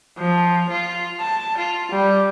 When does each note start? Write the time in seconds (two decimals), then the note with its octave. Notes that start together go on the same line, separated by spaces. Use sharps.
0.18 F3
0.70 F4
1.20 A5
1.58 F4
1.91 G3